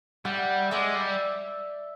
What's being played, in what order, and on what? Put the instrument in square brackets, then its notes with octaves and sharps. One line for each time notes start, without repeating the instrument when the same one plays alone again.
[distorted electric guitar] G3 [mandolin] E5 F#5
[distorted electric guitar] G#3 [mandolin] D5 E5
[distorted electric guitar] G3